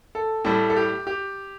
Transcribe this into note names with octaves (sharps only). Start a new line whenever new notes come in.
A4
A2 G3 A4
A4
G4
G4